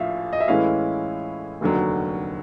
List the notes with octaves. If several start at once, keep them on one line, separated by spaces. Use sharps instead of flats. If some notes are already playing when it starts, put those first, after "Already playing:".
Already playing: A#1 A2 F3 E5 F5
D#5
E5
A2 E3 G#3 C#4 E4 F5
F1 D#2 D3 F#3